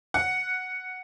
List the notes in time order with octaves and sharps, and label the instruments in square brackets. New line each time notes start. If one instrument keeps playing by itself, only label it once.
[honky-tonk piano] F#5